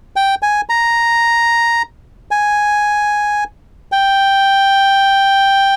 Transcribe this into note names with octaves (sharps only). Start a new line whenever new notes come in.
G5
G#5
A#5
G#5
G5